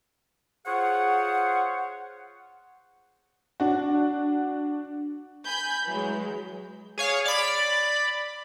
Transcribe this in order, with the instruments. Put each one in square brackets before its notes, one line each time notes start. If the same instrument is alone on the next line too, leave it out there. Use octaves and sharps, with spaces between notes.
[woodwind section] F4 G#4 C5 C#5 F#5
[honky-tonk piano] D4 F#4
[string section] G#5 B5 G6
E3 F#3 G#3
[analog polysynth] G#4 C#5 F5
D5 B5